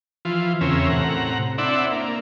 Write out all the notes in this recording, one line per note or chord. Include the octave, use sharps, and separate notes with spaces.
E3 F3 F4
E2 C#3 C4 C#4 A#4 E5
A2 C3 F#5 A#5
C4 D4 E4 D5 E5 F#5
A#3